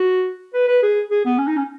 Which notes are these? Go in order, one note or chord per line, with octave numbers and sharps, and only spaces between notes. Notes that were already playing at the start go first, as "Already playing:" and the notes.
Already playing: F#4
B4
B4
G#4
G#4
B3
C#4
D#4
C#4